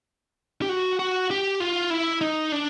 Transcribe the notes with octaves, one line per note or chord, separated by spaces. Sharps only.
G4
F#4
F#4
G4
F4
E4
D#4
D4